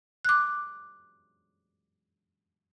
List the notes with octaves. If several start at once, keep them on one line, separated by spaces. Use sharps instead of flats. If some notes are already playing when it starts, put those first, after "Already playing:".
D6 F#6